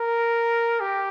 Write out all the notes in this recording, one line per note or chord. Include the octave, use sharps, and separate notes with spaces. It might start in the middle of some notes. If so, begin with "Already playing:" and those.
Already playing: A#4
G4